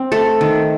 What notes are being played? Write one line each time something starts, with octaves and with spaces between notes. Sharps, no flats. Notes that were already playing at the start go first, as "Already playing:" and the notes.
Already playing: C4
A3 A4
D#3